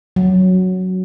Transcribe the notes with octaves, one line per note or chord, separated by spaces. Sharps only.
F#3